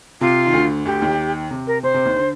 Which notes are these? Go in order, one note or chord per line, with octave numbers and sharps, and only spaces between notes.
C3 F4
D#3
D2 D3
D2 D3 G4
D#2 D#3
C3
A#4
C3 C5
C3
D#2 D#3
D3